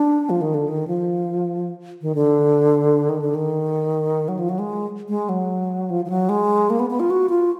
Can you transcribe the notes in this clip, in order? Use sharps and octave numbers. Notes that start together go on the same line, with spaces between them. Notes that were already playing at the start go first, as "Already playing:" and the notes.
Already playing: D4
F3
D#3
D3
D#3
F3
D#3
D3
D#3
D3
D#3
F#3
F3
F#3
G#3
G#3
F#3
F3
F3
F#3
G#3
A#3
B3
B3
F4
F#4
F4